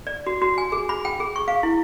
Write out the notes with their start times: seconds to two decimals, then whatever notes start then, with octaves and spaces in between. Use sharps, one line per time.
0.07 D5
0.26 F#4
0.42 F#4
0.58 G#5
0.72 G#4
0.89 B5
1.05 G5
1.20 G#4
1.36 C#6
1.48 F5
1.63 E4